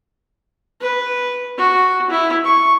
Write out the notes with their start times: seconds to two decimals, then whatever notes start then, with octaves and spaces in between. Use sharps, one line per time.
0.81 B4
1.57 F#4
2.10 E4
2.44 C#6